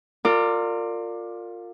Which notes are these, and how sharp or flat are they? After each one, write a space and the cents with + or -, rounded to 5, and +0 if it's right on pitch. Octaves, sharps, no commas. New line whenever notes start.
F4 +15 A#4 -30 D5 +10